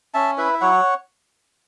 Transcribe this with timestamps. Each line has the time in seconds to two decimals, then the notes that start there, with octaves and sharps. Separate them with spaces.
0.14 C#4 E5 A5
0.38 E4 B4 E5
0.54 E5
0.61 F#3 C#5 F#5